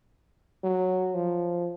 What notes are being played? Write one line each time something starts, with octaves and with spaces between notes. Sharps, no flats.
F#3
F3